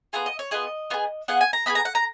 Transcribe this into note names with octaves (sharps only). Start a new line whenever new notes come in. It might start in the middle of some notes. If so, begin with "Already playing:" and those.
B3 F4 G#4 A#5
D#5
C#5
B3 F4 G#4 D#5
B3 F4 G#4
B3 F4 G#4 F#5
G#5
A#5
B3 F4 G#4 B5
A#5
F#5
A#5